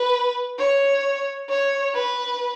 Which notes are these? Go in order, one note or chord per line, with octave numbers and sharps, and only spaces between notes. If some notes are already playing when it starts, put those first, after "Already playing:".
Already playing: B4
C#5
C#5
B4